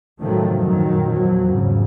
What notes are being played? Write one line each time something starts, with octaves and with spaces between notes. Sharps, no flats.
A2 C3 D#3 F3 F#3 A3
F#2 A#2 D#3 F#3
E2 F3 F#3
G#1 E2 C#3